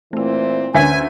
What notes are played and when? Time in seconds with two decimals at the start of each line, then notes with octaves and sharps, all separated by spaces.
0.13 A#2 E3 A3 C4 E4
0.75 D2 C#4 B4 C#5 E5 G#5 B6